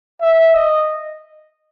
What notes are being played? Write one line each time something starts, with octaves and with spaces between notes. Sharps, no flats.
E5
D#5